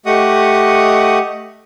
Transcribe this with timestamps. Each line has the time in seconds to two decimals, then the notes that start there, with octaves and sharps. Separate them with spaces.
0.06 A3 G4 D#5 F#5 C#6 D#6